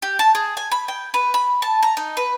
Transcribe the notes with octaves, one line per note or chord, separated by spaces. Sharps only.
G4
A5
G#4
G#5
B5
G5
B4
B5
A5
A#5
D#4
B4